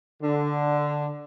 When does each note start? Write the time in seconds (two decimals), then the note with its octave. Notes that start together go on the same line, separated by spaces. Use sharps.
0.22 D3